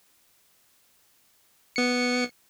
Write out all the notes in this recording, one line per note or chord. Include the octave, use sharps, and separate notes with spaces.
B3 C#7